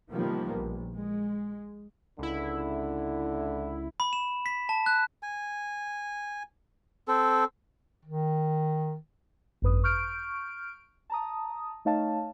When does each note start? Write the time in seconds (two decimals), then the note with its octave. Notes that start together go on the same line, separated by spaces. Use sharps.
0.13 C3 D#3 F3 G3 A#3 B3
0.50 A#1
0.95 G#3
2.18 C#2 D3 E4
4.00 B5
4.13 E7
4.46 B6
4.69 A5
4.86 F#6
5.23 G#5
7.08 C4 A4
8.05 D#3
9.62 G#1 F#2 B4 D#6
9.84 C#6 F6 G6 D7
11.10 A5 A#5 D#6
11.85 A3 D#4 C#5 D#5 F5 A5